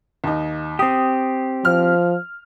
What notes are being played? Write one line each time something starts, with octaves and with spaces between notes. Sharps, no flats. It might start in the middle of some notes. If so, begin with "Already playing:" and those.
D#2 D#4
C4 G4 D#6
F3 F6